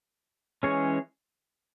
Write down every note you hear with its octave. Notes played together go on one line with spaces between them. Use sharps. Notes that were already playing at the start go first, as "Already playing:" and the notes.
E3 G#3 C#4 G#4 C#5